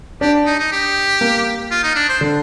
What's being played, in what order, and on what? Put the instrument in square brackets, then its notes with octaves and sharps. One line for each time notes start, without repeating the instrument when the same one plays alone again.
[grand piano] D4 [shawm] G4
[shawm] D#4
D#4
G4
[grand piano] A#3
[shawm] F4
D#4
D4
C5
[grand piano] D3